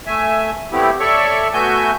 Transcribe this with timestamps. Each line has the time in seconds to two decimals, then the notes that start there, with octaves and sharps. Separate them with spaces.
0.07 A3 E5 G#5
0.72 G3 A3 B3 C4 E4 G4
1.00 A4 C#5 D5 E5 C#6
1.54 A3 B3 F#4 E5 G#5 G6